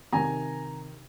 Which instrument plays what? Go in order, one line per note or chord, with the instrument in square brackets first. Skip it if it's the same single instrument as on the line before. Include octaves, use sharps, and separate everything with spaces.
[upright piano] C3 D#3 G#5 A#5